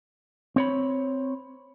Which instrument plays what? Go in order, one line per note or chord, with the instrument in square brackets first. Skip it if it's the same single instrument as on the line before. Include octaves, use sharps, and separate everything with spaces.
[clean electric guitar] C4 C#5 B5